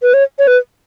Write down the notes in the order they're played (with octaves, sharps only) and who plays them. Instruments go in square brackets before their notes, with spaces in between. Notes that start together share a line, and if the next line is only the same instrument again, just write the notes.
[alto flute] B4
C#5
C#5
B4